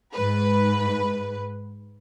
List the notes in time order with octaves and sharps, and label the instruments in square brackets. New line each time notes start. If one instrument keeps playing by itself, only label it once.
[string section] G#2 B4